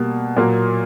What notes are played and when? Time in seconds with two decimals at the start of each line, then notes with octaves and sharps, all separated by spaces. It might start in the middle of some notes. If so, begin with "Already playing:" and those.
Already playing: B2 G3 A#3
0.37 A#2 F#3 A#3